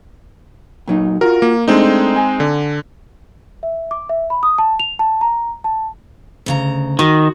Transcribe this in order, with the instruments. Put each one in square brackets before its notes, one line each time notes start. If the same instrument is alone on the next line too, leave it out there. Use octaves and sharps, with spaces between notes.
[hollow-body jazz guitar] A#2 F#3 D#4
[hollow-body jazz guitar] F4 F#4 [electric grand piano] A#4
[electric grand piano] A#3
[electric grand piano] G#3 C4 D#4 [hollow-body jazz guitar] A3 D4
[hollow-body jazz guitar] G#5
[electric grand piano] D3
[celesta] E5
D6
E5
B5
D#6
A5
F7
A5
A#5
A5
[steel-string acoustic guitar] D2 C#3 A#5
[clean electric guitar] D#3 [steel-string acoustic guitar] F#4